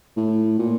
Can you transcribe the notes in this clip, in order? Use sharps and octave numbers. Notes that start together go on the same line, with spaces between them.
A2
A#2